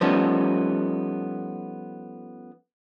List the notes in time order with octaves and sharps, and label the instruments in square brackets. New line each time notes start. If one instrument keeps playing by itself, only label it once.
[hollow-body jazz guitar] F3 G3 A3 B3 C#4 D#4